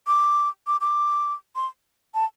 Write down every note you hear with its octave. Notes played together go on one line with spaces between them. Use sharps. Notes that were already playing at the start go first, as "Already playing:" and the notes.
D6
D6
D6
C6
A5